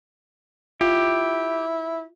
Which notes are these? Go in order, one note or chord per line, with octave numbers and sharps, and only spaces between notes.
E4 F4 G4